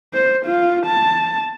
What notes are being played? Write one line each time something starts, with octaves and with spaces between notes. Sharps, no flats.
C5
F4
A5